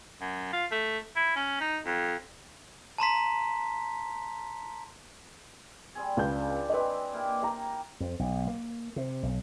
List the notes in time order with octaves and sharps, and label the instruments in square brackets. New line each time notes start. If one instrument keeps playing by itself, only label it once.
[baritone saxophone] F#2
F4
A3
E4
C#4
D#4
F2
[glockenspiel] A5 A#5 C6 B6
[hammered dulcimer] G3 C4 G#4
[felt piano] C#2 G6 [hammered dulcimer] D4
[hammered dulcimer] F#3 C4 [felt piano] B4 D5 D#5
[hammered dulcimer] A#3 E4 G4
[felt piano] G5 A#5
[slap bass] F2
B1
A#3
C3
B1